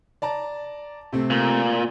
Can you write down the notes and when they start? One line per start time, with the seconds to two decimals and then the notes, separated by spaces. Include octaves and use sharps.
0.22 D5 A5 A#5
1.13 C3 A3 C4
1.30 A#2